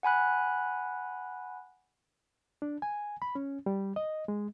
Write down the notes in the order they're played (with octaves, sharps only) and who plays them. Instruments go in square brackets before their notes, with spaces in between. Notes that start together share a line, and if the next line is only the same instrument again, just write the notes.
[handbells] F#5 G#5 B5 F#6
[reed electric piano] D4
G#5
B5
C#4
G3
D#5
G#3